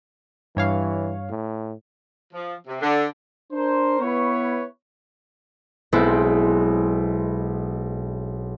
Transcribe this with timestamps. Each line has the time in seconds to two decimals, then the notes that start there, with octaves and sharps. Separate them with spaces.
0.57 G2 E3 C#5 F5
1.30 A2
2.33 F3
2.67 C3
2.81 D3
3.53 D4 A#4 C5
4.00 B3 E4 B4 C#5
5.92 B1 G#3 B3 C4 E4